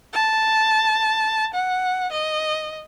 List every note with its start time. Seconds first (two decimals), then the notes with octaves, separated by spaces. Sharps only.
0.13 A5
1.54 F#5
2.12 D#5